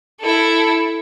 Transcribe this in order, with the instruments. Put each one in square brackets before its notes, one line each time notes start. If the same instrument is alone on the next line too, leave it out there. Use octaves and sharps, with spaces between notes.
[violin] E4 A4